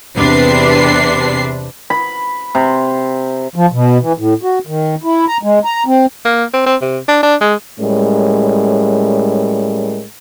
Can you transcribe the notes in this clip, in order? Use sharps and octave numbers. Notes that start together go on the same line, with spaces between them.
E2 C3 D4 B4 C7
B5
C3
F3
B2
E3
A2
F#4
D#3
E4
A#5
G#3
A#5
C4
A#3
C4
C4
C3
D4
D4
G#3
A2 G3 G#3 C#4 A#4